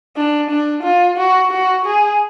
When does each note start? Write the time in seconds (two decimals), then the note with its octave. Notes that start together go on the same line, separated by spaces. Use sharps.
0.16 D4
0.50 D4
0.83 F4
1.17 F#4
1.51 F#4
1.84 G#4